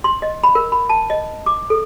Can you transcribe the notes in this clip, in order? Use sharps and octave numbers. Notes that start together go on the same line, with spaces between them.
C6
D#5
B5
A#4
B5
A5
D#5
D6
A4